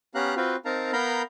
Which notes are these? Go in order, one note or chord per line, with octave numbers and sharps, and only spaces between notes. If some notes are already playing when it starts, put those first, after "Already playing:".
B3 C#4 G4 F5 A#5 F#6
C4 F4 F#4 B4 F5 G5
C4 D#4 A#4 F5 A5 A#5
B3 A#4 F5 A#5 B5 G6